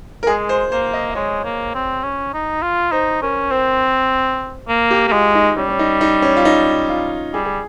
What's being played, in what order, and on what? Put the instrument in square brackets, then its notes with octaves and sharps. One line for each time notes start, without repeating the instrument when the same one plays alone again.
[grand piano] A#4
[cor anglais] G#3 [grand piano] G#4
[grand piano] C5
[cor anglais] A#3 [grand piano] C5
[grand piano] D#5
D#5
[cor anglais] G#3 [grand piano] C#5
[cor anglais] A#3
C4
C#4
D#4
F4
[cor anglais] D#4 [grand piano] C5
[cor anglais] C#4 [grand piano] A#4
[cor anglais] C4 [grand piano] C5
[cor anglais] A#3
[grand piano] G4
[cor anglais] A#3
[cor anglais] G#3 [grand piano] F4
[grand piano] D#4
[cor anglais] G3 [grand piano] C#4
[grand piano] C#4
D#4
D#4
C#4
F4
D#4
F4
[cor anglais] G3 [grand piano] G#4
[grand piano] G#4